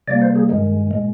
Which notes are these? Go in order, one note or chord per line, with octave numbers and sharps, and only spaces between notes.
C3 G3 A#3 D5
C5
G#4
G2 D#3 G#3
A#2 G#3